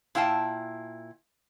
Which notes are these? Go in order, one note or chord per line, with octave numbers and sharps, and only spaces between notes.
A#2 E4 F5 G5 A5